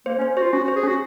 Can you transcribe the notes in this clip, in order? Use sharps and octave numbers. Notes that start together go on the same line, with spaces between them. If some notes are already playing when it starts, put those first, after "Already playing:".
A#3 C5
C#4
C5
F4 F#4 C5
C#4 F#4
F#4
C5
G#4
C#4 F#4